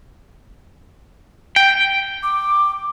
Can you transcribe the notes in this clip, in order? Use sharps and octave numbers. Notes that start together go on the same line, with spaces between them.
G5
D6